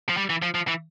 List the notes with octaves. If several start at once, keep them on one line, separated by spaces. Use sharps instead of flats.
F3
G3
E3
F3
F3
E3